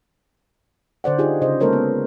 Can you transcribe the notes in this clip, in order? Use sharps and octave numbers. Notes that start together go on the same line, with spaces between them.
D3 C5 D5 F#5
D#4 F4 G4 G#4
C#3 C5 D#5
G#3 A#3 A4 A#4 C5 C#5
B3